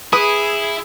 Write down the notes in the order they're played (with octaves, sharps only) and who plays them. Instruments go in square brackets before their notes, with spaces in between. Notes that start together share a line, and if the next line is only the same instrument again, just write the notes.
[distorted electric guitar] E4 [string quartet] G#4 [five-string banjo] B4 [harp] D#6